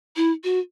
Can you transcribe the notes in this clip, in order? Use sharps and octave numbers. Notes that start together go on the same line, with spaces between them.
E4
F#4